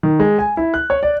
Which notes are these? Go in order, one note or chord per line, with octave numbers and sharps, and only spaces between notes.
D#3
G#3
G#5
E4
F#6
C#5
D5